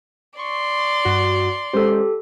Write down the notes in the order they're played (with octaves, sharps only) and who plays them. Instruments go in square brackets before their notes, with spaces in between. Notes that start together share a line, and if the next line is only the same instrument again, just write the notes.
[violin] D5 C6 [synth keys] C#6
[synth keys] G2 F#4
[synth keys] G#3 C#4 C5 [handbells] G4 A4